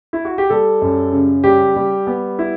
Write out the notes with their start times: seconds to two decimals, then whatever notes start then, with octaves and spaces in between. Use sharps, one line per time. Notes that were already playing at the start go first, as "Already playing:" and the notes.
0.13 E4
0.25 F#4
0.38 G4
0.50 G3 A4
0.82 F#2
1.12 C#3
1.44 G3 G4
1.76 G3
2.07 B3
2.39 E4